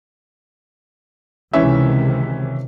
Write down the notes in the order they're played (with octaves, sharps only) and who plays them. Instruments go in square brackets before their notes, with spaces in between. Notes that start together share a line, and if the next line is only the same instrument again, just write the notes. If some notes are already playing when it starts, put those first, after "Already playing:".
[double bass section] C#2 C3 D#3 [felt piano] E3 C#4 E5